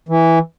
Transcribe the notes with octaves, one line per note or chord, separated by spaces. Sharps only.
E3